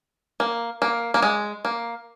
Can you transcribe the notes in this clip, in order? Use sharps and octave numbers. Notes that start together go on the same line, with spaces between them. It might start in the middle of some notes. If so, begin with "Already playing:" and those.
A#3
A#3
A#3
G#3
A#3